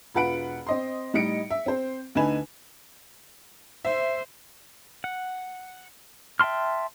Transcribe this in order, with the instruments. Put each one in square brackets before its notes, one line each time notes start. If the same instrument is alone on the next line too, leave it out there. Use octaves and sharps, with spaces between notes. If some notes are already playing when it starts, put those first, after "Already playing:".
[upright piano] E1 F4 B4 F#5 D7
C4 D#5 C6
A2 G3 D#4 D#5 C#7 D7
E5
C4 C5
D2 D3 D#4 B4 G#5 E7
[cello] C5 [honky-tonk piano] E5
[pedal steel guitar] F#5
E5 G5 A5 C6 F6